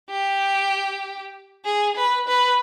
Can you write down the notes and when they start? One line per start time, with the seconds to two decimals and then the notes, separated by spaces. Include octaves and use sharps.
0.10 G4
1.65 G#4
1.96 B4
2.27 B4